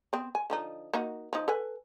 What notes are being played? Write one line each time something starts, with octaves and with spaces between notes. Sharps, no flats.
B3 C4
G#5
D3 F3 D#4
A#3 D#4 F#4
F3 D#4
A4 B4 G#5